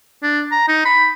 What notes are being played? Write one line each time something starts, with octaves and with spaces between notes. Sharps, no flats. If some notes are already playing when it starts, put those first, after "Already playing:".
D4
A#5
D#4
B5